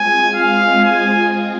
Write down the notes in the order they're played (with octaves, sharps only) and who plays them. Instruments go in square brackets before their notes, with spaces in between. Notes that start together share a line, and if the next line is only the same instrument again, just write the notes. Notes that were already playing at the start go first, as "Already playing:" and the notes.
Already playing: [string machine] G#3 C4 F4 G#4 [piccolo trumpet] G#5
[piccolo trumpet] F5
G#5